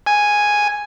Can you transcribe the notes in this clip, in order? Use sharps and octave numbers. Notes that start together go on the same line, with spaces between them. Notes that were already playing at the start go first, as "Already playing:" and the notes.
G#5